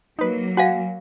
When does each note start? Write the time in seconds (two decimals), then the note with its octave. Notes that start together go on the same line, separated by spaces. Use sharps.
0.19 F#3 A#3 D#4 B4
0.57 F#4 F5 F#5 G#5 A#6